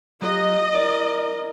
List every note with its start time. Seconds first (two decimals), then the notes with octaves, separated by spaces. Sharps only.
0.22 F#3 F4 G4 D#5
0.75 E4 A#4 D5